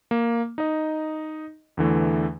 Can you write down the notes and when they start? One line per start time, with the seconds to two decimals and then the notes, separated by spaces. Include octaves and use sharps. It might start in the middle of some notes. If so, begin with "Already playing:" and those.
0.11 A#3
0.58 D#4 D#5
1.77 E2 D3 E3 A3